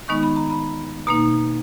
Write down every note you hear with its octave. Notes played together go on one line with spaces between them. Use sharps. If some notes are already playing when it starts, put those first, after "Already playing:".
D#3 G#3 B3 D#4 C#6
B5
A#5
B5
B2 A#3 D#4 A#5